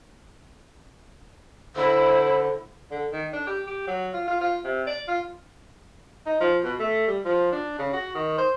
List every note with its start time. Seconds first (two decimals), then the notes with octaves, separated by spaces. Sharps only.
1.76 D3 E4 C5
2.92 D3
3.13 D#3
3.33 D4
3.47 G4
3.67 G4
3.87 F#3
4.14 F4
4.28 F4
4.41 F4
4.65 C3
4.87 D5
5.08 F4
6.26 D#4
6.41 F3
6.63 B2
6.79 A3
7.07 G3
7.25 F3
7.52 D4
7.79 C#3
7.93 F#4
8.15 D#3
8.38 C5